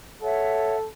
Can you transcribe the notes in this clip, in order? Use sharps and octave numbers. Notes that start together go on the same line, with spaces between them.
A4 C#5 E5 F#5